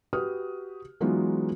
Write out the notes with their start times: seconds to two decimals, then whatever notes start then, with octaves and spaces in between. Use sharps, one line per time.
0.13 F#4 G4 B4 D#6 F6
1.01 E3 F#3 G#3 B3 D#4 F4